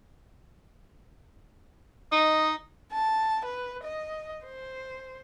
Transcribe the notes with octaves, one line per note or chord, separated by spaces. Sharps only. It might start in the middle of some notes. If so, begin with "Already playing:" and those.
D#4 D#5
A5
B4
D#5
C5